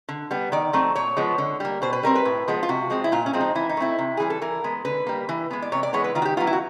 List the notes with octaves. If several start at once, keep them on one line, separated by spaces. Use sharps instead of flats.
D3
G3 B3
D#3 D5
F#3 A3 C4
A#2 C#5
F3 G#3 B3
D3
G3 A#3
B2 C5
B4
G3 C4 A#4
B4
A2
F3 G#3 B3
F4
C3 F#4
F3 G#3 C4
E4
A#2 F4
C#4
F3 G#3 C4
D#4
E3 E4
D#4
A3 C4 E4
C3
E3 G3 G#4
A4
E3 A#4
G#3 B3
D3 B4
G3 A#3
E3
G#3 B3
D5
C3 C#5
D5
E3 G#3 B3 C#5
B4
D#3 F4
F#4
G4
F#3 B3 F4
E4
F#4